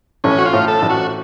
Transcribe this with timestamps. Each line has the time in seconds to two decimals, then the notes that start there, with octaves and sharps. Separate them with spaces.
0.24 A1 C#4
0.38 F#4
0.46 F4
0.53 A2
0.68 A4
0.82 A1
0.90 F#4